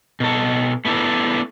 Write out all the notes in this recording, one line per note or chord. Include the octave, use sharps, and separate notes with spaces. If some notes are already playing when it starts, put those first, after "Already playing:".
B2 A4
A3 B3 D4 E4 A4